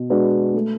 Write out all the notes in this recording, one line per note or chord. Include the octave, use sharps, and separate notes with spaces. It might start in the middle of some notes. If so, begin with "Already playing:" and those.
Already playing: B2
G#3 D4 F#4 B4
A3